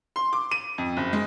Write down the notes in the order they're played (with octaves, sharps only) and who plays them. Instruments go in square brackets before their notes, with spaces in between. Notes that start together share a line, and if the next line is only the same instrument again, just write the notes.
[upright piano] C6
D6
D#7
F2
F#1
G#3